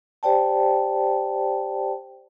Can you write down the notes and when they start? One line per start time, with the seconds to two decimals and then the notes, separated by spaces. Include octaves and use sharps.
0.23 G4 C5 D5 G5 A5